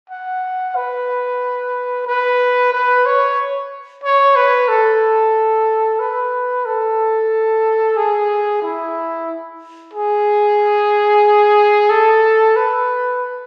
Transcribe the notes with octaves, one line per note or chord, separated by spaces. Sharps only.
F#5
B4
B4
B4
C#5
C#5
B4
A4
B4
A4
G#4
E4
G#4
A4
B4